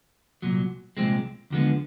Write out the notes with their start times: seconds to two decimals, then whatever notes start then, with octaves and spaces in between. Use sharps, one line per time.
0.42 C2 A#2 F#3
0.97 C2 A#2 F3 G#3 C4
1.50 D#2 D3 F3 G#3 B3